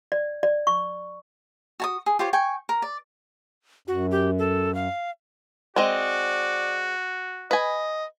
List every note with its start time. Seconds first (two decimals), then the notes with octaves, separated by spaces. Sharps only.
0.12 D5
0.43 D5
0.67 C#6
1.80 F#4 A5 D#6
2.06 G#4
2.19 F4 G4 C5 C#5
2.33 G5 G#5 C#6
2.69 A#4
2.82 D5
3.88 F#2 F#4
4.11 G4
4.39 A4
4.75 F5
5.76 G#3 C4 F#4 D5 D#5
7.51 B4 D#5 G#5